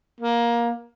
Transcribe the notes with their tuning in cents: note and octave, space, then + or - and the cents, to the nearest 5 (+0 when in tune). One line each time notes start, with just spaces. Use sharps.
A#3 +15